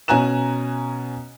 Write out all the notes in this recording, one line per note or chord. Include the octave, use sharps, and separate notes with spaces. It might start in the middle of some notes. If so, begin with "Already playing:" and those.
B2 C#4 G#5 A#5 F#6 E7